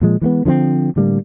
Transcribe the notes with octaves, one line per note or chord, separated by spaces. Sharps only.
A#2 F3 G#3
E3 G#3 A3 B3
D3 F3 G3 C4
A2 D3 G3 A#3